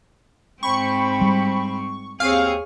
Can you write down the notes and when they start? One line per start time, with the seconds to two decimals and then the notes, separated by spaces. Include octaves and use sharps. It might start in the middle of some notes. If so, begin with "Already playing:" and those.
0.63 G#2 C4 C5 G5 B5 C#6
1.21 G3
2.20 D#2 C4 G#4 C#5 F5